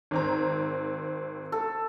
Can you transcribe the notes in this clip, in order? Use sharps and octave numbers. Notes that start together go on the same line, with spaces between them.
G#1 C4 A#5
A4